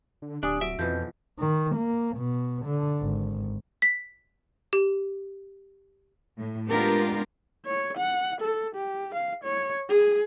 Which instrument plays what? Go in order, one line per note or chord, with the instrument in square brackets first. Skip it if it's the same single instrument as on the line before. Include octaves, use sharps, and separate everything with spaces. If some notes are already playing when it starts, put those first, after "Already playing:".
[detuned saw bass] D3
[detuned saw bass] D1 [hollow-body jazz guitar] D4 [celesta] G4 G#5 D#6
[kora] F#3 [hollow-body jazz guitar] E5 [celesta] D7
[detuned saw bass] F2 [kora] B2 E3 F3 [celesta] B4 G6
[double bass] D#3
A#3
B2
D3
G#1
[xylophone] B6
G4
[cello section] A2
G#3 B3 D4 F4 G4 A#4
[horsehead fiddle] C#5
F#5
A4
G4
F5
C#5
G#4